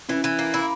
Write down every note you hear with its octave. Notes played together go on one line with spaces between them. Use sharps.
E3 C#4 E4
E3
A#3
E4